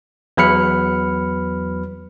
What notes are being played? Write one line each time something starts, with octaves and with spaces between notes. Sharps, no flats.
E2 F#3 B4 B5 F6 C#7